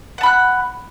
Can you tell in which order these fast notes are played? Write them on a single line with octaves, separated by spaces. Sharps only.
F#5 A5 B5 F#6